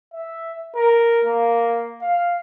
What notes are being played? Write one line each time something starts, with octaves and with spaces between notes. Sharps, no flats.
E5
A#4
A#3
F5